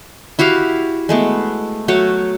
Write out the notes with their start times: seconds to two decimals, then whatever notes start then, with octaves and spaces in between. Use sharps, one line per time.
0.39 E4 F#4 G4 F5
1.09 G#3 A3 B3
1.88 F#3 A3 F#4 C#5